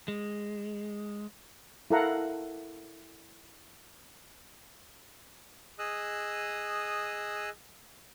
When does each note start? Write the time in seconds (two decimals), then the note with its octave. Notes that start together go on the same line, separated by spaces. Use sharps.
0.08 G#3
1.91 E4 A4 A#4 F5 F#5 A#5
5.79 G#4 D#5 D#6 E6 F#6